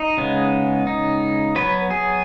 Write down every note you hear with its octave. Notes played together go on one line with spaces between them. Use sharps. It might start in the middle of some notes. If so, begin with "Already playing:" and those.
Already playing: D#4
C#3 G#3 B3
D#4
F#3 B3 B4
G#4